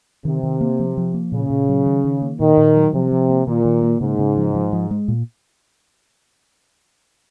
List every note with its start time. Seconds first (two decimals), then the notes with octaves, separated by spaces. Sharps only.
0.25 C3 D#3
0.43 D#3
0.61 A#3
0.79 F3
0.97 F3
1.14 A#3
1.32 A#2 C#3
1.50 A#2
1.69 F#3
1.86 D#3
2.04 D#3
2.22 A#3
2.40 A#2 D#3
2.57 A#2
2.76 F#3
2.94 C3 F3
3.12 F3
3.29 A#3
3.47 A#2 D#3
3.65 D#3
3.83 A#3
4.01 G#2 C#3
4.19 C#3
4.37 F3
4.55 F3
4.73 F3
4.91 G#3
5.08 A#2